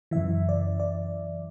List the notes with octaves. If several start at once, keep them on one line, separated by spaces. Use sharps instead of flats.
F#2 C#3 E3 E5
D5
D5